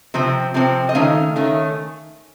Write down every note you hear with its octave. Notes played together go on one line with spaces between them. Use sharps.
C3 F3 C4
C3 F3 C4
D#5
D#3 A3 C#4 F5
D#3 A3 C#4